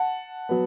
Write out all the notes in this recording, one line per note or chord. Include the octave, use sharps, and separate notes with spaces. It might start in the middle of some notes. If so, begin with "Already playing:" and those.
Already playing: F#5 A5
F#3 B3